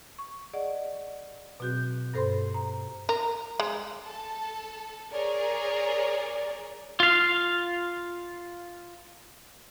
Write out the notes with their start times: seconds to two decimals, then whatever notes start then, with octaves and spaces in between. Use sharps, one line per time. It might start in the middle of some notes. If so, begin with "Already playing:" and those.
0.19 C#6
0.53 G#4 D5 D#5 F#5
1.60 B2 F#3 C4 F#4 G#4 G6
2.14 G2 A4 C5 B5 C6
2.54 A#5
3.09 A#4
3.60 G#3
4.04 A4 A5
5.12 G#4 A#4 C#5 D5
7.00 F4 F5